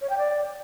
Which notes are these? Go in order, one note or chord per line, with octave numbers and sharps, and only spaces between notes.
C#5
G5
D5